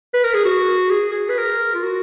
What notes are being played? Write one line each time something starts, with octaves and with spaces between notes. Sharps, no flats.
B4
A#4
G#4
F#4
G#4
G#4
B4
A#4
F4
F#4